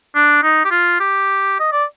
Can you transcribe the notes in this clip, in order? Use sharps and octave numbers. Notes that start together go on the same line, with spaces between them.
D4
D#4
G4
F4
G4
D#5
D5